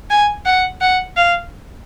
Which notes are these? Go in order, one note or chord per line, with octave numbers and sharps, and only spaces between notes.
G#5
F#5
F#5
F5